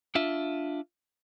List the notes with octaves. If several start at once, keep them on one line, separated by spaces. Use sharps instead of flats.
D4 F4 E5